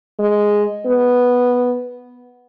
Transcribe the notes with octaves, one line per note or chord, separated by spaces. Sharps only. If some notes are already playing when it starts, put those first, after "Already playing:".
G#3
B3